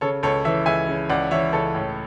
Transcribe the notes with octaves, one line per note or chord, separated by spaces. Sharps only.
C#3 A4 C#5
C#2 A4 C#5
E3 C#5 E5
C#2 E5 G#5
C#3
C#2 D5 F#5
E3 C#5 E5
C#2 A4 C#5
A2